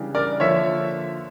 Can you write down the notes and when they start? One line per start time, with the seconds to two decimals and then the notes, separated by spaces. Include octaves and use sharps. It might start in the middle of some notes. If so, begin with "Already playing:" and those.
Already playing: C#3 E3 G3 D4
0.15 A#4 D5
0.40 D3 F3 A#3 C#5 E5